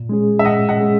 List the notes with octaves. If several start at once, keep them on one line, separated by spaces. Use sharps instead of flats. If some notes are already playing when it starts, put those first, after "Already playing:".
Already playing: A#2
G#3 C#4 G#4
E5
A#2 D#5 F#5
D#5 F#5
G#3 C#4 G#4